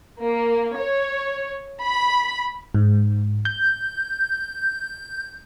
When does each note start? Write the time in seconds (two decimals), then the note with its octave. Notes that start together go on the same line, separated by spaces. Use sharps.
0.23 A#3
0.80 C#5
1.83 B5
2.75 G#2
3.45 G6